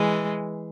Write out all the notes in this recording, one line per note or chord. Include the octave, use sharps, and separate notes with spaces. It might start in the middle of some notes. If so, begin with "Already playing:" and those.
Already playing: E3 G#3